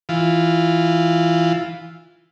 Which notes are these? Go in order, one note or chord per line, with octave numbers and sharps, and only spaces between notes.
E3 F4